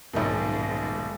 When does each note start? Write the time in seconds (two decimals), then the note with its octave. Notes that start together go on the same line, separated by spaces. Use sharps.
0.13 D#1 B1 G#2